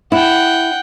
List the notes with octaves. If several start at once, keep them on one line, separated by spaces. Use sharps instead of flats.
E4 F#5 G5